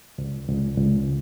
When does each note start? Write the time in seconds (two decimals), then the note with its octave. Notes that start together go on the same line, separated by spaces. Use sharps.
0.18 C#2
0.48 C#2
0.77 C#2